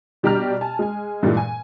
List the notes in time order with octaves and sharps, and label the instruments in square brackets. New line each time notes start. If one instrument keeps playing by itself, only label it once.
[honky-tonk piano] B2 G3 D4 G4 A#5 F6
G#5 A5
G#3 G#5
G2 A#2 E3 G3 G#3
G#5